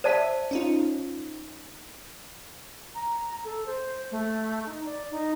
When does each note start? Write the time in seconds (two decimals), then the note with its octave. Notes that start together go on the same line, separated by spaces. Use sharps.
0.04 C5 D5 E5 A5 B6 D#7
0.51 C#4 D#4 F4
2.95 A#5
3.44 A4
3.66 C5
4.11 A3
4.66 D#4
4.85 D5
5.11 D#4